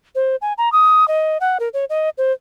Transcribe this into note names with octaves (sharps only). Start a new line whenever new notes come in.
C5
G#5
A#5
D#6
D#5
F#5
A#4
C#5
D#5
C5